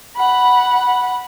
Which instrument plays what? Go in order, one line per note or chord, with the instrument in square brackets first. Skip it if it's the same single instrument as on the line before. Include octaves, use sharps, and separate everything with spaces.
[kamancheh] F#5 B5